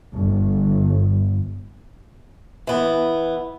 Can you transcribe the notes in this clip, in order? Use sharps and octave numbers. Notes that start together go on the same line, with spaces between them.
G1
E3 B3